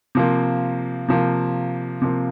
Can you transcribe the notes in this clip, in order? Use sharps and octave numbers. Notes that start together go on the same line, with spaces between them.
C3 F3 A#3
C3 F3 A#3
C3 F3 A#3